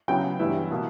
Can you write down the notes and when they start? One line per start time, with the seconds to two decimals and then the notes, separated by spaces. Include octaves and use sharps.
0.08 C#3 F#3 B3 E4 G5
0.39 G2 E3 G3 B3 E4
0.71 B2 A#3